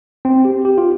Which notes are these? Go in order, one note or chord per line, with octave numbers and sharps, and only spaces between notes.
C4
G4
G4
F4